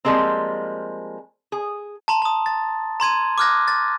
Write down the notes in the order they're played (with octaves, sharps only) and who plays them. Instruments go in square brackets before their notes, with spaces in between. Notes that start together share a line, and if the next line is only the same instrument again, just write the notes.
[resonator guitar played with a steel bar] F3 G3 G#3 A#3 C4
G#4
[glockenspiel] A5 A#5 C6
A5 D#6
A6
A#5 C6 G#6 D#7
D6 D#6 F6 F#6 G#6 A#6
A6